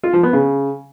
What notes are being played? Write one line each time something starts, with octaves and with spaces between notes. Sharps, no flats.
F4
F3
B3
C#3